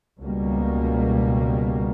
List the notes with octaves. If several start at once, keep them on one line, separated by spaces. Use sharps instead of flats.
C#2 B2 G3 A#3